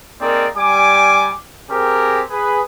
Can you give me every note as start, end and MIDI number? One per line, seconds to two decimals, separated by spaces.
0.21 0.46 58
0.21 0.46 60
0.21 0.46 63
0.21 0.46 68
0.21 0.46 70
0.21 0.46 74
0.57 1.32 55
0.57 1.32 80
0.57 1.32 86
1.70 2.23 60
1.70 2.23 67
1.70 2.23 68
1.70 2.23 70
2.30 2.61 68
2.30 2.61 71